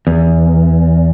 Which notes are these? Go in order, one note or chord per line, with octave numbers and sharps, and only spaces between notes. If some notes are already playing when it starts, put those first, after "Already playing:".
E2